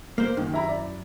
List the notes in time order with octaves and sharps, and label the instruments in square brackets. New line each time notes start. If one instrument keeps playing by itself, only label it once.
[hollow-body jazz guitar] A#3 C5 [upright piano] A#4
[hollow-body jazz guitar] F#2 [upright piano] D#3
[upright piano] E4 A#5 B5
D5